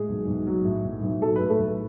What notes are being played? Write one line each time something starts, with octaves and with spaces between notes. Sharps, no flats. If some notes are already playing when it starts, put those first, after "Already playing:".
Already playing: A2 G#3 G#4
B1
B1
F#3
A2
B1
B1
F#3 A4
A2 B4
A3 A4
B1